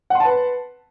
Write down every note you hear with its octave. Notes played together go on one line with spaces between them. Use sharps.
B4 F#5 A5 C6